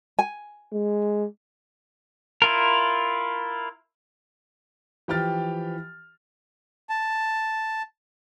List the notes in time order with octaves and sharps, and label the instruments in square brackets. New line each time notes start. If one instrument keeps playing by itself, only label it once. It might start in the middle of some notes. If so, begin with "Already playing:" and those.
[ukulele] G#5
[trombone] G#3
[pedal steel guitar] E4 F4 A#4
[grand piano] E3 F3 G4 G5 F6 A6
[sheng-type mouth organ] A5